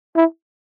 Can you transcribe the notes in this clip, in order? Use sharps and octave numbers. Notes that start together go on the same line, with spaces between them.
E4